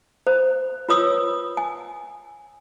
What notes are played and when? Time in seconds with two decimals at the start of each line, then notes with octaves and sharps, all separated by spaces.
0.27 C5
0.89 F4 B4 C#5 D#6 E6
1.57 G#5